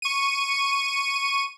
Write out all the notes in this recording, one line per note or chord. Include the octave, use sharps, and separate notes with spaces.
C#6 D#7